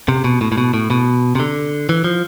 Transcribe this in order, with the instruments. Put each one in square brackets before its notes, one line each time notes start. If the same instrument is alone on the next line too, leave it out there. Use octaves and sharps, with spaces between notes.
[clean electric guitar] C3
B2
A2
A2
B2
A2
B2
C3
D3
E3
F3